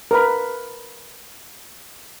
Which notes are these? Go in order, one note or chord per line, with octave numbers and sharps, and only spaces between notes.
A#4 B4 B5